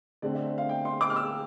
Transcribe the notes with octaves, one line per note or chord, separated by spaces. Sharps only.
D3 A3 C4 D5
E5
E5
F5
G5
C6
D6
F6
E6